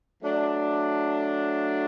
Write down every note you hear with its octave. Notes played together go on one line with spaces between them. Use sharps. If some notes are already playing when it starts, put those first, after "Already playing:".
F#3 A3 D4